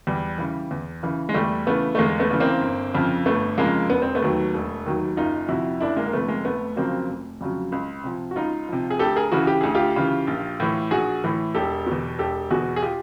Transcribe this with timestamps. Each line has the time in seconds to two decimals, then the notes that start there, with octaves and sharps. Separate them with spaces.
0.07 E2 G3
0.38 C#3 E3
0.71 E2
1.03 C#3 E3
1.29 G#3
1.34 E2 G3 A3
1.67 C#3 E3 A3 B3
1.95 A3
1.98 E2 G#3 A#3
2.19 A3 B3
2.31 C#3 E3
2.40 A#3 C4
2.62 G1
2.94 F2 C#3 F3
3.26 G1 A3 B3
3.58 F2 C#3 F3 G#3 A#3
3.90 E1 B3
4.02 C4
4.15 A3 B3
4.22 D#2 D#3 F#3
4.54 E1
4.86 D#2 D#3 F#3
5.17 F#1 D#4 F4
5.49 F2 C3 E4 F#4
5.80 F#1 D4 E4
5.96 G#3 A#3
6.07 A#3
6.13 F2 C3 A3 B3
6.28 G#3 A#3
6.44 F1 A3 B3
6.76 F2 C#3 F#3 A#3 C4
7.08 F1
7.41 F2 C#3 F#3
7.72 C#2
8.04 C3 F3
8.31 F#4
8.36 C#2 D#4 F4
8.69 C3 F3
8.90 G#4
8.99 D2 G4 A4
9.16 G#4 A#4
9.32 C#3 E3 F#4 G#4
9.47 G4
9.61 D2 G#4
9.75 F4 G4
9.96 C#3 E3
10.27 A#1
10.60 A2 E3
10.91 A#1 F#4 G#4
11.24 A2 E3
11.55 E1 G4 A4
11.86 B2
11.92 E2
12.19 E1 G4 A4
12.50 E2 B2 F#4 G#4
12.76 G#4
12.83 F4 G4